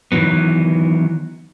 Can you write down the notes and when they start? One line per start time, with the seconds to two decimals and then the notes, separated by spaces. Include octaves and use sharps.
0.12 D#3 E3 F#3 B3